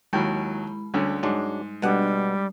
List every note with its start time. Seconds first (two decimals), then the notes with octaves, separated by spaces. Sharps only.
0.13 D#2 F#3 G#3 E4 B5
0.94 D2 D3 G3 C#4
1.23 G#2 F#3 G#3 D4
1.82 B2 G3 G#3 D4 F#5